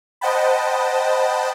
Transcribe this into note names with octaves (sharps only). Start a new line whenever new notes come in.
C5 D#5 F#5 G5 A5 B5